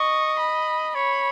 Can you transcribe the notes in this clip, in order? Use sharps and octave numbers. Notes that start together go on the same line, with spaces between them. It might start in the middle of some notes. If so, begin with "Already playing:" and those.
Already playing: D#5 C#6
B5
C#5 B5